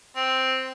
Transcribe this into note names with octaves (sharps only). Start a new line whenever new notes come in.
C4